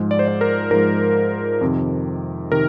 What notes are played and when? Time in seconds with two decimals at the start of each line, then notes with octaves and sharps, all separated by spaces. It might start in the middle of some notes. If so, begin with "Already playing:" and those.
Already playing: G#2 F3 G#3
0.11 D5
0.19 C5
0.28 D5
0.41 A#4
0.71 G#2 F3 G#3 A#4
1.61 F2 C3 D#3
2.52 C3 D#3 A#4